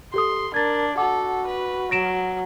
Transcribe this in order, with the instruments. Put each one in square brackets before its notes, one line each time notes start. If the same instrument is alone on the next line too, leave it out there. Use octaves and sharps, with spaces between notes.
[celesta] G4 A4 D#6 [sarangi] C6
[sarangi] D4 [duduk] A#4 [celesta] G#6 A6
[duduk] F#4 [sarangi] A4 [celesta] F#5 D6
[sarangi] B4
[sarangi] F#3 [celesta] A#6 D7 E7